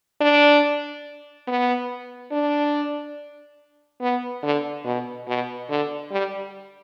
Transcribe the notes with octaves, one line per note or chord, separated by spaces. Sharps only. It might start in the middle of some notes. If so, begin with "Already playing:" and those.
D4
B3
D4
B3
D3
B2
B2
D3
G3